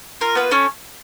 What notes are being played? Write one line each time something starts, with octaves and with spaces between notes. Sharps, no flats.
F4 A#4
A#3 B3 B4
C#4 A4 C#5